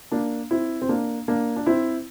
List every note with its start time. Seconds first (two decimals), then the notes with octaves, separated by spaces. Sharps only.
0.12 A#3 D4
0.51 C4 E4
0.82 C4
0.89 A#3 D4
1.28 A#3 D4
1.56 D4
1.66 C4 E4